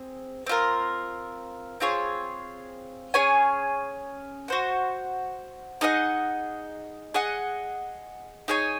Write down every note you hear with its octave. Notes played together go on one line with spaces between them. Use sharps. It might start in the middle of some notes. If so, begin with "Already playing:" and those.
Already playing: C4 G#4
C4 F4 A#4
C4 F4 G#4 C#5
C#4 G#4 C#5 G#5
F#4 C5 F#5
D#4 G#4 D#5 F#5
G#4 D#5 F#5
D#4 G#4 C#5 G#5